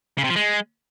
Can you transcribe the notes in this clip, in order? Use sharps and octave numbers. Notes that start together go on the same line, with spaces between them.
C#3
C3
F3
G#3